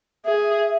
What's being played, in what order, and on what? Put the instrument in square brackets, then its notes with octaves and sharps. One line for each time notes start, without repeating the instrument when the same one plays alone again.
[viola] G#4 [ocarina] E5